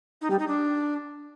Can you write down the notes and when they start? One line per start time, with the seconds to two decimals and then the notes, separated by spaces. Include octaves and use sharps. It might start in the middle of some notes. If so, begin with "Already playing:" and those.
0.21 D#4
0.30 G3
0.39 D#4
0.47 D4